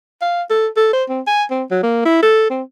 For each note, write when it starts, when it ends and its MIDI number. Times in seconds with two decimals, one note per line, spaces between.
0.21 0.43 77
0.50 0.67 69
0.77 0.88 69
0.93 1.04 72
1.09 1.21 60
1.27 1.44 80
1.51 1.64 60
1.71 1.83 54
1.83 2.01 58
2.05 2.21 64
2.22 2.46 69
2.50 2.62 60